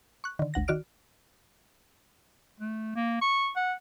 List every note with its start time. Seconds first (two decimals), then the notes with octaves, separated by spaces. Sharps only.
0.24 C#6 F#6
0.39 D3 D#3
0.54 G#1 D2 F#5 A#6
0.68 D#3 F#4 D5 F6 D7
2.60 A3
2.96 A#3
3.22 C#6
3.56 F#5